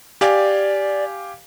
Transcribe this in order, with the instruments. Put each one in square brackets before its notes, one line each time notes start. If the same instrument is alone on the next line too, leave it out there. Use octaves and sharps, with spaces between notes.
[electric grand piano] G4 F5 G#5 [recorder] D5